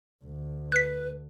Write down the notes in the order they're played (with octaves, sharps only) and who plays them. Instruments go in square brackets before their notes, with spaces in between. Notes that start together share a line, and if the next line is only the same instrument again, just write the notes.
[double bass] D2
[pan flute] B4 [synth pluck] F#6 B6